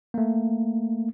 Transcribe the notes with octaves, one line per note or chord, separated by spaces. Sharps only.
A3 A#3